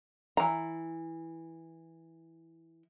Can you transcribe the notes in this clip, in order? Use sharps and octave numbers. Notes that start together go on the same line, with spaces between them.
E3 A#5